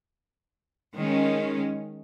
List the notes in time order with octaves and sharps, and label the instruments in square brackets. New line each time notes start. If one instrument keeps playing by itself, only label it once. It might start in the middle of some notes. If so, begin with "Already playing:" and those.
[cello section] D#3 G#3 C#4